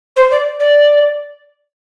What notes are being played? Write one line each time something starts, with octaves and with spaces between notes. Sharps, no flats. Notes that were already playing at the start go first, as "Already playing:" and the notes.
C5
D5
D5